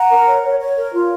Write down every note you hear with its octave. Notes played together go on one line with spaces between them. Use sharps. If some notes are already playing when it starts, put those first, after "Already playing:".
Already playing: F#5 A#5
A#4
C#5
C#5
C#5
A#4
F4